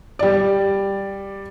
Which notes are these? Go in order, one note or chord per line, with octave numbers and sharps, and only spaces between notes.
G3 D5